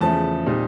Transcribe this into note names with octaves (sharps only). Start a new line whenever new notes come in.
E2 C#3 F3 A3 A5
A#2 G3 C4 D#4